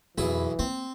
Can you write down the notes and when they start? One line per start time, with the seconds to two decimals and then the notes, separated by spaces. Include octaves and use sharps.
0.18 B1 F2 E3 E4 G#4
0.59 A#3 C4